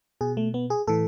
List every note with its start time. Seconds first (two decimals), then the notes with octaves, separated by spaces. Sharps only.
0.21 B2 G#4
0.37 A3
0.54 B3
0.70 G#4
0.87 A2 E3 A4